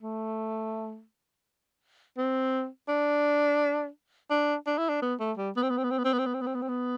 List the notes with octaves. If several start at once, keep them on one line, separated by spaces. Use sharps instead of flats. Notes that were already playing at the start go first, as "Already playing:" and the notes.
A3
C4
D4
D4
D4
E4
D4
B3
A3
G3
B3
C4
B3
C4
B3
C4
B3
C4
B3
C4
B3
C4
B3
C4
B3
C4
B3